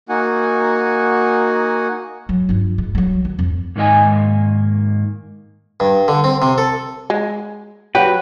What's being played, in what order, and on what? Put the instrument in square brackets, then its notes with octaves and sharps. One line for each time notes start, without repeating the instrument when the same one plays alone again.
[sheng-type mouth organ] A#3 D#4 F#4 F#5 G#5
[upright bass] F#3
G2 F4
G#3
F#3 G3
D#3
F2
[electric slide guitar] G#2 D#3 A#3 D#5 G#5
[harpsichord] G2
D3
C4
C3
A4
[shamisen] G#3
[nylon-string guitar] F#3 F#4 C#5 [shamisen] G4 [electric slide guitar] B4